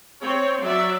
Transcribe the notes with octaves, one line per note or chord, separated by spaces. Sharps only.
C4 C#5
F#3 D5 E5